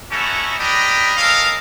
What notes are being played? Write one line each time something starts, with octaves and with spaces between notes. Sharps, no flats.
A3 C#4 D#4 E4 F#4 A4
D4 G4 A#4 D#5 B5
B3 C#4 A4 A#4 D#5 F5